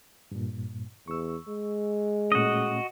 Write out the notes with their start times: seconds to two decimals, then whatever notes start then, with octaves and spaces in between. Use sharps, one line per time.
0.31 G2 A#2
1.08 E2 C#6 E6
1.49 G#3
2.32 A#2 A3 C#4 F#4 D#5